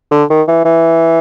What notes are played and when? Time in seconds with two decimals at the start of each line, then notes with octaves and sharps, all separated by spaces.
0.11 D3
0.30 D#3
0.48 E3
0.65 E3